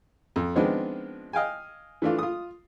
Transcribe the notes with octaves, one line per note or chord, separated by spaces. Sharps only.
F2
D#3 F3 G#3 B3 C4 D4
D#5 F5 G5 G#5
E3 A3 D4 F4
F4 D#6